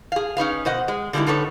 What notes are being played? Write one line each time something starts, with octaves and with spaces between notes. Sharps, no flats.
G#4 F5
C#4 D#4 B4 F5
B2 C5 D#5 F#5
G#3
D3 G3 G#3 B3 D#4 E4
A2 D3 D#4 A4 B4 C#5